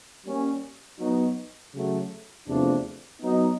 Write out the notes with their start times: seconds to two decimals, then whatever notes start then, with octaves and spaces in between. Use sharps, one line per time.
0.25 G3 A#3 C#4
0.99 F#3 B3 D#4 F#4
1.73 C#3 F#3 A3
2.47 E2 C3 F3 A3 D4
3.21 F#3 B3 D#4